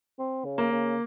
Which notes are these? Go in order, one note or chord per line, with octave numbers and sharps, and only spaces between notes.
C4
C#3
A#3
C#3